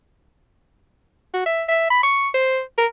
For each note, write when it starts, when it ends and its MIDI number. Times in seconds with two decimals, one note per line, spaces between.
1.34 1.45 66
1.46 1.63 76
1.69 1.88 76
1.90 1.99 83
2.03 2.29 85
2.34 2.60 72
2.78 2.86 70